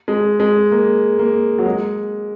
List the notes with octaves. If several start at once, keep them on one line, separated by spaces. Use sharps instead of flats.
G#3
G#3
A#3
A#3
F#3
G#3